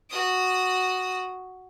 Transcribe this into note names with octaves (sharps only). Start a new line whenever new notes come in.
F#4 D#6